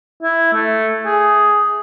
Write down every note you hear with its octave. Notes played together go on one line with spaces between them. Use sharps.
E4
A3
G#4